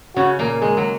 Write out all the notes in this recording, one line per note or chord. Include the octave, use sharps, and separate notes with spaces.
C#3 C#4 F#4
A#2 A#3
G#3 G#4
F#3